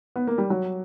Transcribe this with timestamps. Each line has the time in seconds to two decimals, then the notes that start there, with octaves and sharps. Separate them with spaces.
0.16 B3
0.27 A#3
0.38 G3
0.50 F#3